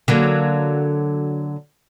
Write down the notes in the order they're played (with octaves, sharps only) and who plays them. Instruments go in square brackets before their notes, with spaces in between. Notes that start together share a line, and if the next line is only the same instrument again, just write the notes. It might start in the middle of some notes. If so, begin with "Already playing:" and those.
[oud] D3 F#3 A#3